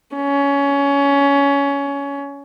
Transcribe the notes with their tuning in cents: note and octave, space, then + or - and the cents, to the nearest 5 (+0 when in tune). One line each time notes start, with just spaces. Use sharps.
C#4 +20